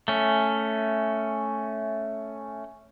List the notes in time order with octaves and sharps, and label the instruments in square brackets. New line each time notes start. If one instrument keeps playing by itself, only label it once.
[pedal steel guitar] A3 C#4